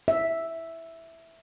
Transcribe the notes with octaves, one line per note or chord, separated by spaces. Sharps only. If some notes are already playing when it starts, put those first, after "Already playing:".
E5